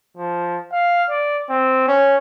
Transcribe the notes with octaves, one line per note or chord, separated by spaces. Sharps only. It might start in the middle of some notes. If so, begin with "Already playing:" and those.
F3
F5
D5
C4
C#4